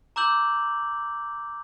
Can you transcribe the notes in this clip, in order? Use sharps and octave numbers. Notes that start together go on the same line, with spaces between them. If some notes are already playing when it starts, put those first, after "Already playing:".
A#5 D6 E6 G6 F#7